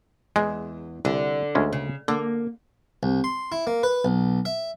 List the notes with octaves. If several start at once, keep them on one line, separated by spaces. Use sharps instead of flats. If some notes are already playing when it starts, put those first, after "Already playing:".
E2 G#3
C2 D3
D2 G#3 C#4
C#3
D3 A#3
C2
C6
E4
A#3
B4
B1
E5